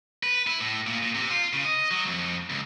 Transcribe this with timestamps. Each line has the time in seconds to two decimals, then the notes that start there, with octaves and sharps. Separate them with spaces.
0.23 B4
0.47 E4
0.61 A2
0.87 A#2
1.02 A#2
1.14 C3
1.30 F4
1.53 C#3
1.65 D#5
1.91 F#3
2.06 F2
2.50 C#2